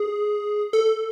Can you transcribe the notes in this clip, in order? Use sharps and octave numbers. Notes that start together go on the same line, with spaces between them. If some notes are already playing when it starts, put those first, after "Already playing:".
Already playing: G#4
A4